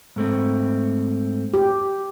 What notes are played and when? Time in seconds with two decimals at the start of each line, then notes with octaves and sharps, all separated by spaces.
0.16 G#2 A3 C4
1.54 G4